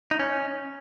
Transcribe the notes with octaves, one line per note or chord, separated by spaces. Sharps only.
D#4
C#4